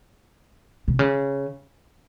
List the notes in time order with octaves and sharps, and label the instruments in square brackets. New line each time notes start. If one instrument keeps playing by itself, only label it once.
[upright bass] C3
C#3